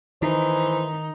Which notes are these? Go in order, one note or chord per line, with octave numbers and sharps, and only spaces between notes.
D#3 E3 D#4 C5